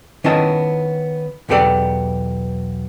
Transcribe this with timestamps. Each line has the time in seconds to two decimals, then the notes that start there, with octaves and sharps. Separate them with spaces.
0.24 D#3 B3 C#4 E4 D#5 A5
1.49 B1 E2 B3 G4 A4 D5